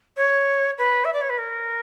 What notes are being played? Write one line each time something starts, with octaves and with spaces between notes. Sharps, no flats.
C#5
B4
E5
D5
C#5
B4
A#4